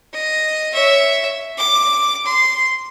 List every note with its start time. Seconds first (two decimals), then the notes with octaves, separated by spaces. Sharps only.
0.14 D#5
0.73 C#5 E5
1.58 D6
2.26 C6